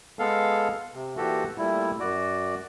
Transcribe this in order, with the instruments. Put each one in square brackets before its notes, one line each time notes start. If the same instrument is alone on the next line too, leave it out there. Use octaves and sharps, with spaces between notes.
[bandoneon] G#3 B3 A4 F5
C3
A#2 E3 F#4 G4 A4
A#2 G3 A3 E4
F#2 F#4 D5